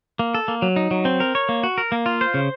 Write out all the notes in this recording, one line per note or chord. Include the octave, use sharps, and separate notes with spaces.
A#3
A4
A#3
F#3
D#4
F#3
C4
A#4
C#5
A#3
F#4
A#4
A#3
F4
C5
C#3